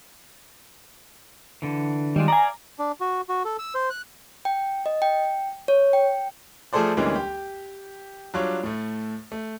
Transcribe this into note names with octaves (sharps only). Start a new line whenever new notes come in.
D3 E3
D#3 G3 G#3 F4
D5 D#5 F5 G#5 A#5
D4
F#4
F#4
A4
E6
C5
F#6
G5
D#5
G5
C#5
G5
F3 A3 G#4 A4 C5 D5
D2 E3 G3 G#3 A#3 C#4
G4
F#3 G3 D4 F4 C#5
A2 A3
A3